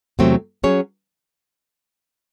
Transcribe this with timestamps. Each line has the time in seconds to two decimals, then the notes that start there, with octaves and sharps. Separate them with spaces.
0.19 E2 C3 F#3 A3 C4
0.64 F#3 C#4 G#4 C#5